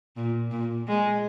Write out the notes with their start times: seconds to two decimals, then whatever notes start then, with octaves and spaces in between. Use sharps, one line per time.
0.16 A#2
0.51 A#2
0.88 G#3